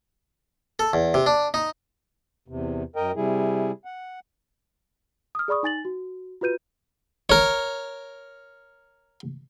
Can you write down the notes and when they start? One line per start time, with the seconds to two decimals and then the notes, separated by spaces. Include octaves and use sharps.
0.79 A4
0.93 E2
1.14 C3
1.26 D4
1.54 D#4
2.48 E2 C3
2.96 F#2 A#4 D#5 G5
3.16 C3 G3 E4 G#4
3.85 F#5
5.35 D#6 F6
5.48 G#4 D5 B5 C#6 D#6
5.63 D#4 G#5 A6 F#7
5.85 F#4
6.41 F4 F#4 B4 G6 D#7
7.30 A#4 C#5